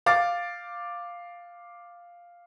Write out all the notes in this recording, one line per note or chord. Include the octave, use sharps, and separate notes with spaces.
F5 D6 A6